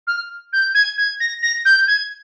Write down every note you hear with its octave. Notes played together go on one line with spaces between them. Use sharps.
F6
G6
G#6
G#6
A#6
A#6
G6
G#6